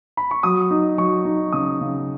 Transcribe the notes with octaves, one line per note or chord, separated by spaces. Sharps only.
B5
C#6
F#3 D#6
D#4
F#3 C#6
D#4
C#3 D#6
C#3